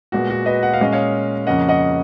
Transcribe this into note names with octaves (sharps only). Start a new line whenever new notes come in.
A#2 G#3 B3 F#4
F#4
B4 D#5
F#5
F5
A#2 G#3 C#4 D#5
C#5 F5
F2 C#3 F3 A#3 C#4 D#5 F#5
D#5 F#5